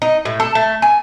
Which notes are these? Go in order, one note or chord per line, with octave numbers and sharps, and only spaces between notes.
D#4
A2
A4
A3
G#5